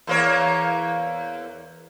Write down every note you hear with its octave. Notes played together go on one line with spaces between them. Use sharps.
E2 A#3 C#5